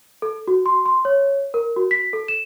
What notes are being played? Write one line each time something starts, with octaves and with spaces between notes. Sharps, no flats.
A4
F#4
C6
C6
C#5
A#4
F#4
B6
A4
E7